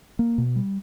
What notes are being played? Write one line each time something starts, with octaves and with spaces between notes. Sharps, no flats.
A#3
B2
G3